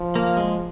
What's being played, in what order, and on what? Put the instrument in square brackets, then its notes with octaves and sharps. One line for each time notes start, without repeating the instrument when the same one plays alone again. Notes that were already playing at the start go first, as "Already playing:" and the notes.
Already playing: [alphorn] F3
[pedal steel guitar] A#3
G#3